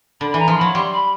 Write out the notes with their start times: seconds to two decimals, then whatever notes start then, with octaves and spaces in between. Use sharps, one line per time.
0.20 D3 B5
0.30 B5
0.34 E3
0.39 A#5
0.48 F3 C6
0.57 F#3 B5
0.74 G3 C6
0.93 B5